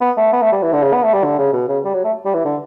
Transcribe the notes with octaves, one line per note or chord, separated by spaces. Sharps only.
B3
A3
B3
A3
G3
E3
D3
C#3
B3
A3
G3
D3
C#3
B2
C#3
G3
F#3
A3
G3
E3
D3